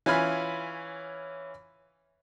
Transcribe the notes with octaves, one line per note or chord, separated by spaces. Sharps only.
E3 C#4 F4 G#5 B5 F6